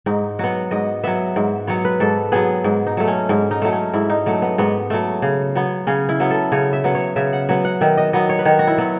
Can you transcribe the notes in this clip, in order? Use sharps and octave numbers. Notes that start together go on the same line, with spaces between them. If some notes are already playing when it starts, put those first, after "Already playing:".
G#2 D#4
F#3 B3 F#4
G#2 D#5
F#3 B3 E5
G#2
F#3 B3 C#5
B4
G#2 A4
F#3 B3 G#4
G#2
D#4
F#3 A3
C#4
G#2
D#4
F#3 A3
C#4
G#2 E4
D#4
F#3 A3
B3
G#2 B3
F#3 A3
C#3
F#3 B3
C#3 C#4
E4
F#3 B3
A4
C#3 C#5
E5
F#3 B3
C#5
C#3 E5
F#5
F#3 B3 E5
F#5
D#3 E5
D#5
F#3 B3 D#5
C#5
B4
D#3 C#5
F#4
E4
F#3 B3